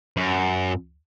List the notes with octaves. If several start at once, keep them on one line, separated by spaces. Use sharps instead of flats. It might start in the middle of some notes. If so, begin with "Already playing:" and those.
F#2